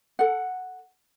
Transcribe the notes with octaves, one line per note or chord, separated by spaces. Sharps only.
A4 F#5